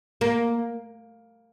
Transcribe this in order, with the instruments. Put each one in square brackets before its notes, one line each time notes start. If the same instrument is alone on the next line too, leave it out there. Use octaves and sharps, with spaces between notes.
[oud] A#3